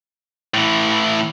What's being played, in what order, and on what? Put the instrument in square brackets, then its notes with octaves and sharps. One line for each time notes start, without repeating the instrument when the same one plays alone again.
[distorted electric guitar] A2 E3